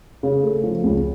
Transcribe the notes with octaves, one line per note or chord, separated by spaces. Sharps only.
C#3
A3
F3
C#2